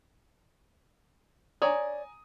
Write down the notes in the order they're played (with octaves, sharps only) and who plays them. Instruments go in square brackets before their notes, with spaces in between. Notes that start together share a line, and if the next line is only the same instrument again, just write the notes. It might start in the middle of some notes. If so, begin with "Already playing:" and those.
[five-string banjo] C#5 D5 [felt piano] G#5 A#5 D#6